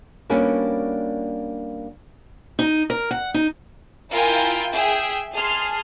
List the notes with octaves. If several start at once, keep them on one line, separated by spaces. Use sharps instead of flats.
G3 A#3 B3 C#4 D4 F#4
D#4
A#4
F#5
D#4
E4 F4 A#4 G5 G#5
G#4 E5 G5
G#4 A5 C6 F6